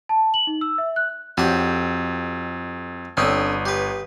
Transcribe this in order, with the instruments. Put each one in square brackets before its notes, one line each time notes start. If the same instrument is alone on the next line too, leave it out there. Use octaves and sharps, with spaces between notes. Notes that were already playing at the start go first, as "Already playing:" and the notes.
[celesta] A5
F#7
D#4
E6
E5
F#6
[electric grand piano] F2 [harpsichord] F#4 G4 C#5
[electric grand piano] G1 D#6 [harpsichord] D3 C4 C#4
[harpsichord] G4 B4